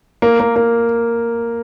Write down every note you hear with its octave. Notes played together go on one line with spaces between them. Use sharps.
A#3
A#3
A#3